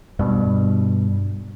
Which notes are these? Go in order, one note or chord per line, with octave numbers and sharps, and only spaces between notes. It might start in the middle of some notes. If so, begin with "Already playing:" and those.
G2 B2